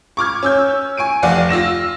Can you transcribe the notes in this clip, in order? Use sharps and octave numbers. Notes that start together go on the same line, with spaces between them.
C#6 D6 F6 G#6
C#4 E6 G6
G#5 C#6 D7 D#7
F1 D5 F5 F#5
F4 E6 A#6 E7